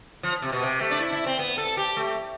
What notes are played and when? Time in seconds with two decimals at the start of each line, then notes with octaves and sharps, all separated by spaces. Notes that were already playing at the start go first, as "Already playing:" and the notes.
0.23 F3
0.42 C3
0.52 B2
0.62 C3
0.81 A3
0.91 D4
1.00 E4
1.13 E4
1.26 C4
1.39 B3
1.58 A4
1.77 G4
1.97 A3